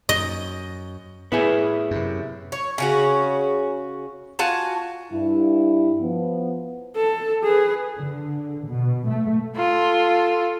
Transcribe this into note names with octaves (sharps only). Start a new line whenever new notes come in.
F#2 D#5
A2 B3 E4 G#4
F#2 C3
C#5
C#3 C#4 F#4
F4 F#4 G#5 A5
G2 E4
F3 B3
A4
G#4 B4
D3
B2
A3
F4 A4